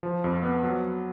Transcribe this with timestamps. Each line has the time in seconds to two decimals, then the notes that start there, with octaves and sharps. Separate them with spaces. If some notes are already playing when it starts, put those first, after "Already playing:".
0.03 F3
0.24 F2
0.43 B3
0.63 F#3